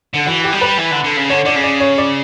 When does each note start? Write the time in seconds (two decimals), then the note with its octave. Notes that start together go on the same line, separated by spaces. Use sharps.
0.14 D3
0.26 E3 F#4
0.44 G4
0.53 G3
0.61 B4
0.78 E3
0.91 D3
1.04 D3
1.17 C#3
1.30 D3 C#5
1.45 D3 D5
1.56 C#3
1.64 D5
1.80 C#5
1.98 D5